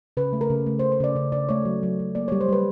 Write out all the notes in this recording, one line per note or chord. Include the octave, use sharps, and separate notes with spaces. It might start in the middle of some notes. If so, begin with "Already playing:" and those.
C#3 B4
A3
A#4
C#3
A3
C5
C#3
C5
C#3 D5
C#3 D5
C#3 D5
A3 C#5
F#3
F#3
F#3
A#3 D5
C#5
G3
C5
G3 B4